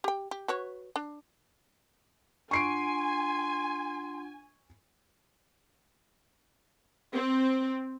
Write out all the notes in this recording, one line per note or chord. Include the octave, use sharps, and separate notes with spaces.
G4 G5
G4
F#4 B4 C#5
D4
D4 F4 F#5 G#5 C6 C#6 C7 D7
C4